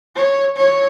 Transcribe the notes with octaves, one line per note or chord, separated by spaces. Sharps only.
C#5
C#5